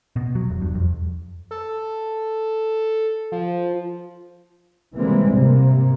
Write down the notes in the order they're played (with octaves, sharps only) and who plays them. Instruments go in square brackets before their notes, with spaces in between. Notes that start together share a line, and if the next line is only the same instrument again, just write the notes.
[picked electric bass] B2
F#3
E1
G2
F2
[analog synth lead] A4
F3
[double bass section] C3 E3 G3 G#3 A#3 C4
G#2 C3 A#3